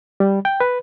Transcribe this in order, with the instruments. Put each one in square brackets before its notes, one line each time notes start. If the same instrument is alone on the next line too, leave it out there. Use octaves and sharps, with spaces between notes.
[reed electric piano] G3
G5
B4